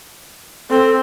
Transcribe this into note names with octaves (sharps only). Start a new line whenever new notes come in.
C4 A4